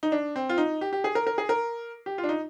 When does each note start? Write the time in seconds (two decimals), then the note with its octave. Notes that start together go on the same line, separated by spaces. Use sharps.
0.03 D#4
0.12 D4
0.36 C4
0.49 F4
0.58 D#4
0.81 G4
0.93 G4
1.04 G#4
1.15 A#4
1.27 A#4
1.38 G#4
1.49 A#4
2.06 G4
2.18 F4
2.24 D4
2.29 D#4